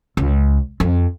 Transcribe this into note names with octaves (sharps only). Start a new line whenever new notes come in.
C#2
F2